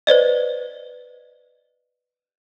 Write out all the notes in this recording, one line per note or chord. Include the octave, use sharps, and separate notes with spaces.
B4 C5 D5 D#5